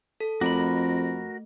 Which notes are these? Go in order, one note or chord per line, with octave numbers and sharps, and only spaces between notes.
A4
F2 A3 F#4 A#4 B5